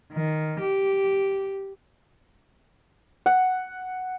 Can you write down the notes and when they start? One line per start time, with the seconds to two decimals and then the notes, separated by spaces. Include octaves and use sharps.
0.12 D#3
0.62 G4
3.26 F#5